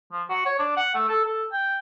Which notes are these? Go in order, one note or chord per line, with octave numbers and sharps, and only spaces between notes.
F3
F#4
C#5
D4
F#5
A3
A4
A4
G5